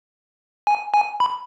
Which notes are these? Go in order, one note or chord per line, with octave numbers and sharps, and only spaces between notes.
G#5
G#5
B5